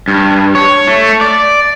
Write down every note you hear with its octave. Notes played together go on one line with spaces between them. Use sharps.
G2
C#5
A3
D5